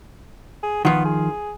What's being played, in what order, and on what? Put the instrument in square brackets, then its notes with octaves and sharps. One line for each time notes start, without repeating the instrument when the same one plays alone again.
[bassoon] G#4
[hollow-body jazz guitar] D#3 F3 [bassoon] B3
[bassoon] G#4